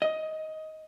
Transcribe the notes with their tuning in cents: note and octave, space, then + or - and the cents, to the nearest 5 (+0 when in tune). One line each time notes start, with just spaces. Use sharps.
D#5 +15